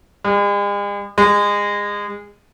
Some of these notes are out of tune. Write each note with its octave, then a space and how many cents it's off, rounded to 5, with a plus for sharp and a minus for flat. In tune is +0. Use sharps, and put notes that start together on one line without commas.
G#3 -45
G#3 -25